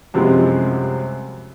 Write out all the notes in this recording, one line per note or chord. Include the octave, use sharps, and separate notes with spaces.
F#2 C3 F3 G3 G#3 E4